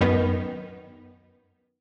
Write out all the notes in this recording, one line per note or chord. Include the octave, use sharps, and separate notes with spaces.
F#2 D#3 B3